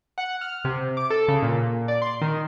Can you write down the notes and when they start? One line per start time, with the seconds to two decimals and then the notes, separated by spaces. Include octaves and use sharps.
0.18 F#5
0.41 F6
0.65 C3
0.97 D6
1.10 A4
1.28 C#3
1.43 A#2
1.88 D5
2.02 C6
2.21 D#3